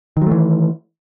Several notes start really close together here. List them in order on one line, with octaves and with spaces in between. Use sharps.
D#3 F#3 A3 E3